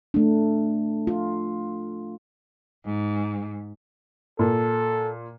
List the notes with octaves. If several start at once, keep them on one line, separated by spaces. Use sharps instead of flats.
A3 D4
F4
G#2
A#2 A4